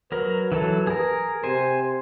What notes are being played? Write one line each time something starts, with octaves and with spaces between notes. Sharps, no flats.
F#3 A#4 B4
E3 F#3 A4
G#4 A#4
C3 C5 G#5